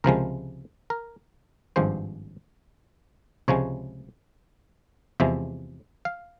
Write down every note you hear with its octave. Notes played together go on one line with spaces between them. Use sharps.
C#2 C3 F3 G#3 A#4
A#4
G#1 G2 F3 G#3 C5
C#2 C3 F3 G#3 C#5
E2 C3 F3 G#3 E5
F5